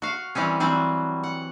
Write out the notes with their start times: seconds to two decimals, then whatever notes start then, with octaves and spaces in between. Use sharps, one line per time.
0.02 F#4 F5
0.35 E3 G3 C4 C#4
0.60 E3 F#3 G3 C4
1.23 F#5